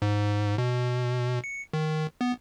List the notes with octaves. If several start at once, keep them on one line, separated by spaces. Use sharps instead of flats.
G#2
B2
C#7
D#3
B3